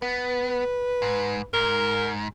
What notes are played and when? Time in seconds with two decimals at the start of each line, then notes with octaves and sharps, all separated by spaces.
0.02 B3 B4
1.02 G#2
1.54 G#2 A#4